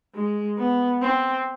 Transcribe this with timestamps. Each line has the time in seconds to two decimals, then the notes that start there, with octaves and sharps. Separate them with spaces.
0.15 G#3
0.58 B3
1.02 C4